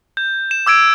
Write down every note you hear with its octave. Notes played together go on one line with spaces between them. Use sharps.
G6
E7
D6 E6 G#6 D7